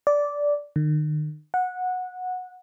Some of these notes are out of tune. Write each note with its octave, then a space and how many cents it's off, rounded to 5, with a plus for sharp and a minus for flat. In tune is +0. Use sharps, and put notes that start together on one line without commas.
D5 -10
D#3 -40
F#5 -15